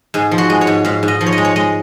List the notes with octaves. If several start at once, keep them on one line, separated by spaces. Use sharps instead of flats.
G#2 G#4
F3
F#4
G#3
C#5
G#2
G#2 F5
G#2
D#5
F3
C#5
D#5
G#3
C#5
G#3 D#5